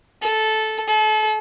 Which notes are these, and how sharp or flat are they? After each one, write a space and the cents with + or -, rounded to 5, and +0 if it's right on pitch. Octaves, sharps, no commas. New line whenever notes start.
A4 -10
A4 -35